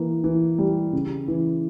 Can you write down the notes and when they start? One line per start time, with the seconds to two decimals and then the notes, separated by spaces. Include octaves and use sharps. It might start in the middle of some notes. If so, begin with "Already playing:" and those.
Already playing: E3 A#3
0.24 E3
0.58 G3
0.93 C#3
1.28 E3